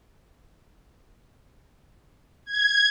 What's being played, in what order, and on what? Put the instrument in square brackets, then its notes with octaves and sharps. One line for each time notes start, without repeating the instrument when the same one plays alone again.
[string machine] G#6